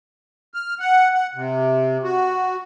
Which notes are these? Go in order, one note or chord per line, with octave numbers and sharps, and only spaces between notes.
F6
F#5
F#5
C3
F#4